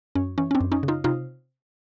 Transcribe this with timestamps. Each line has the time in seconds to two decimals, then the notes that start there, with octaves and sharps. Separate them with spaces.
0.15 F#2 C#4
0.38 E3 C#4
0.51 C#4
0.55 C4 D4
0.61 F#2
0.72 C#4 D#4
0.83 C#3
0.88 D#4 F4
1.04 C3 D#4 F4